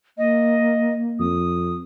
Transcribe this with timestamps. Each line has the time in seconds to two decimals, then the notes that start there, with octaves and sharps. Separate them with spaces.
0.18 A#3 D#5
1.20 F2 D#6